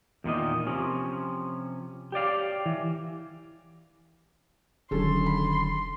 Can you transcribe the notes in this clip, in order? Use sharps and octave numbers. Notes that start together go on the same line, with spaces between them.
E2 A#2 D#3 D#5
C3 F3 C#4
G4 C#5 D5 F5
E3
E1 D3 D#3 F#3 C#4 A4 C6
B5